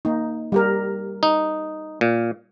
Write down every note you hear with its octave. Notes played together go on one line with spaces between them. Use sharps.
A#3 D#4
G3 G4 A#4
D#4
A#2